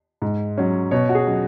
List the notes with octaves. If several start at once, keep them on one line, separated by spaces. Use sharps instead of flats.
G#2
F#3 C#4
B2 C#5
F#4
G#4
F#3 C#4